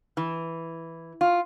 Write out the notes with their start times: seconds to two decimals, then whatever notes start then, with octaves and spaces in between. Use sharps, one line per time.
0.17 E3
1.21 F4